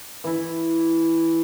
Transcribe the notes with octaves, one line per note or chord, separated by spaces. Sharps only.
E3 E4